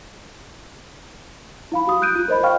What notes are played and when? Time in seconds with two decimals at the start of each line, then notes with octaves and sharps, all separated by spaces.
1.72 E4 F5 B5
1.87 F#4 D#6
2.02 F#6 G6 D7 D#7
2.16 F4
2.28 A#4 C5 D#5 B5
2.43 D#5 F5 G5 C#6 F6